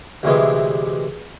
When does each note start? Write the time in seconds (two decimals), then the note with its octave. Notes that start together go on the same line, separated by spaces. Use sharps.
0.23 D2 C3 E3 G#3 B3